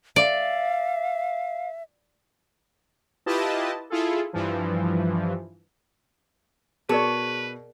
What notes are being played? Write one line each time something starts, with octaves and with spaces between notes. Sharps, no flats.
D5 E5 F5
E4 F4 G4 B4 D#5 A5
E4 F4 G#4 A4
G2 E3 F3
B2 G#4 A#4 B4 C#5 D5 A5 C#6